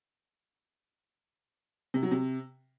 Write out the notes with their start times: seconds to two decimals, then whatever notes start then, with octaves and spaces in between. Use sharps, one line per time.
1.94 C3
2.03 F#3
2.11 C3